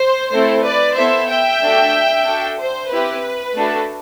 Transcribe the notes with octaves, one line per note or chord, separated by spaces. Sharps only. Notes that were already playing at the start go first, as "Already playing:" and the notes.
Already playing: C5
A3 C4 E4 A4 C5
B4 D5
B3 E4 A4 C5 E5
E5 G5
A3 D4 F#4 A4
D4 F#4 A4
C5
C4 E4 G4 B4
A3 D4 F#4 A4